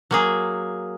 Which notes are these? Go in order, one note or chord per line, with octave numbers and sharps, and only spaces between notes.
F#3 A#3 G#4